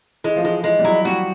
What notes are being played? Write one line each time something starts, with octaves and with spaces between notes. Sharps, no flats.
E3 G#3
F3
E3 G#3
E3 G#3
G3
F#3 E4
G3 F#4